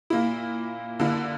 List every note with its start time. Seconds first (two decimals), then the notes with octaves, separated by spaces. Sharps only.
0.10 A#2 A#3 E4
1.00 D3 A#3 E4